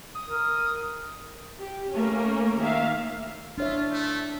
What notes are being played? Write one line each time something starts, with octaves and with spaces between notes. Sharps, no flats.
D#6
A#4
G4
A3 A#3 C#4
D#3 A#3 E5 F5
D4 F4 C#5 E5
A3